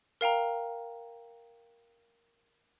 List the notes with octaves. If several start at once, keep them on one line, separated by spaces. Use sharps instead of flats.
A#4 F5 G5 A#5